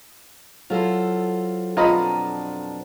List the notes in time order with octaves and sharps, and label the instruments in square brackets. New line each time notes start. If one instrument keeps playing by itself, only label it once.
[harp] F#3 E4 [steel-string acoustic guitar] F4 A4 C5
[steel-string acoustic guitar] F2 D4 [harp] B2 A#5 F6 [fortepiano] F4 D#5 B5